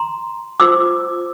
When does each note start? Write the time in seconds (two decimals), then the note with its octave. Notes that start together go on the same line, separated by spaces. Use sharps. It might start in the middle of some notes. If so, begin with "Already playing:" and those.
Already playing: A#5 C6
0.60 F4 A4 C5 D6 E6